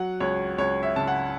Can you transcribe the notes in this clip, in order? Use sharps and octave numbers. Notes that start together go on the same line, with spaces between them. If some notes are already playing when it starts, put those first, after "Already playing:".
Already playing: F#3 F#5
C#2 C#5
C#2 C#5
E5
C#3 A5
F#5